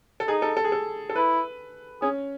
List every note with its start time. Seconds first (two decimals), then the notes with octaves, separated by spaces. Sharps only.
0.20 A4
0.28 D#4 G#4
0.42 A4
0.57 A4
0.64 G#4
0.72 A4
1.10 A4
1.16 E4 B4
2.02 C#4 G#4